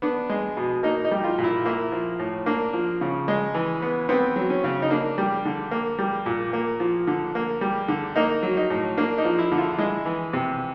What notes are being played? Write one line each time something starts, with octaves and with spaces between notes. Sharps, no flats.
B3 D4
G#3
B2
A#3 D#4
D#4
G3
F4
A#2
E4
A#3 E4
F3
A2
A#3 D4
F3
C#3
G#3
E3
B3
B3 C4
F#3
C#4
C#3
D#4
A#3 D4
G3
D3
A#3
G3
A#2
A#3
F3
D3
A#3
G3
D3
A#3 D#4
F#3
D#4
A2
A#3 D4
D#4
F3
E4
D3
F4
G#3 E4
E3
C3